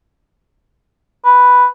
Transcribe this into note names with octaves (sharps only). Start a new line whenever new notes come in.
B4